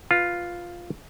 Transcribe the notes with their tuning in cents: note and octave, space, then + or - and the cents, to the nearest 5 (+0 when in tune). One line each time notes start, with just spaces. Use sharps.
F4 +0 B4 +0